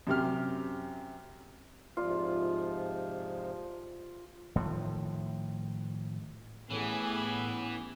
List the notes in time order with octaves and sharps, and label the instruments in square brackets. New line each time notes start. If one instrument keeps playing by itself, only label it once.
[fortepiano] F#2 C3 G4 F6
[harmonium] G#2 C3 F3 [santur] F4 D5
[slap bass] A2 D#3 F3
[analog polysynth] A2 [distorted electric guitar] E3 [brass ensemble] B3 C#4 G4 [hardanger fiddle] G#4